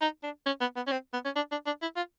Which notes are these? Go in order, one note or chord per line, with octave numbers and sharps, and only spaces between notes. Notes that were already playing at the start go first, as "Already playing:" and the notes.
D#4
D4
C#4
B3
B3
C#4
C4
B3
C#4
D4
D4
D4
E4
F4